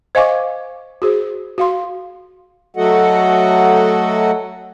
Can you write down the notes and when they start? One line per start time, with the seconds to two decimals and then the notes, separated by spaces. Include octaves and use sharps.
0.15 C5 D#5 F5 G#5 C#6 D6
1.02 F#4 G#4 C5
1.58 F#4 F5 C6
2.77 F#3 A3 F#4 A4 D#5 F#5